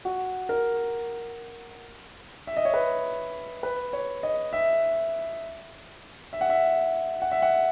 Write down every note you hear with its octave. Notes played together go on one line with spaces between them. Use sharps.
F#4
A#4
E5
D#5
C#5
B4
B4
C#5
D#5
E5
E5
F#5
E5
F#5
E5
F#5